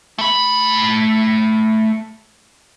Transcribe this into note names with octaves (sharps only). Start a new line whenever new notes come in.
A3 B5